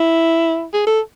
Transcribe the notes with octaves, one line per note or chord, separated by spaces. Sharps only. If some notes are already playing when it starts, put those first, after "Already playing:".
Already playing: E4
G#4
A4